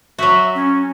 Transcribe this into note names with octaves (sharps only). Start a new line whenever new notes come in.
F#3 F#4 E5
C#4